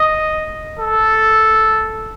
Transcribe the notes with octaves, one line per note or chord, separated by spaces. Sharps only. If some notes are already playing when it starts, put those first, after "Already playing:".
Already playing: D#5
A4